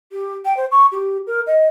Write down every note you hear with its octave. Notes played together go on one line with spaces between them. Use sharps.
G4
G5
C5
C#6
G4
A#4
D#5